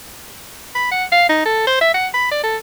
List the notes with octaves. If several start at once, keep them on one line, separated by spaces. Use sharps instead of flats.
B5
F#5
F5
D#4
A4
C5
E5
F#5
B5
D5
A4